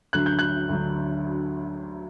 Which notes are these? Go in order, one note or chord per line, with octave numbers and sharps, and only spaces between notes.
D2 D3 F#3 F#6
G6
F#6
D2 D3 F#3